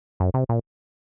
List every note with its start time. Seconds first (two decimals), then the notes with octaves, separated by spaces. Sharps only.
0.20 F#2
0.34 C3
0.49 A#2